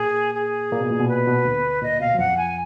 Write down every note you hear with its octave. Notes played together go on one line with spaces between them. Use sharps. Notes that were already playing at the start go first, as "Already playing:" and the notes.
Already playing: A#2 A#3 G#4
G#4
A#2 A#3
B2
A#2
B2
B4
B2
D2 D3
A#2 D#5
B2 F5
F#3
F2 F3 F#5
G#5